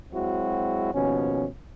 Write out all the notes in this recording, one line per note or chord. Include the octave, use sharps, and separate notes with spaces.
F#3 G#3 C4 E4 F#4
D#2 B2 F3 C#4